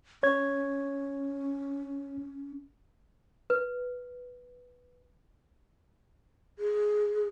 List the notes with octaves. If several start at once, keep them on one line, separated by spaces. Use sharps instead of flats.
C#4 C#5 G#6
B4
G#4